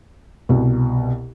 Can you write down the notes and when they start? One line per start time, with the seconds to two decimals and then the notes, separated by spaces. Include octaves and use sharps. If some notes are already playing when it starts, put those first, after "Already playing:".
0.49 C2 B2